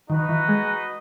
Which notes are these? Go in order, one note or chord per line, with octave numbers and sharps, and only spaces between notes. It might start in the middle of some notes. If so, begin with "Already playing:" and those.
D#3 D#4 F#4 B4 D#5
E3
G#3